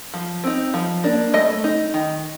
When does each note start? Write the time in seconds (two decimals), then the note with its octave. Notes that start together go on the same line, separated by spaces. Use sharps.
0.14 F3
0.44 C4 D#4
0.74 F3
1.04 A#3 D4
1.34 A3 D#5
1.64 D#4
1.94 D#3